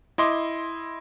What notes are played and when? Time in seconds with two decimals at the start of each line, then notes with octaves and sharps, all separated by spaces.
0.18 E4 D#5 C6 D6